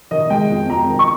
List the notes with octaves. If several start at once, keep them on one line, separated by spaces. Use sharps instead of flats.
D#3 D#5
G#3 G5
F2
F2 A#5
D#3
C#6